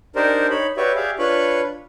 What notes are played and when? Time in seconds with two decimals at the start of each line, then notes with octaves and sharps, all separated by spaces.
0.16 D4 D#4 G4 A#4 C5 D5
0.50 D#4 C#5 B5
0.77 F#4 G4 B4 C#5 D5 E5
0.96 G4 G#4 D5 E5 F5
1.19 D4 F4 B4 C#5 B5 C#6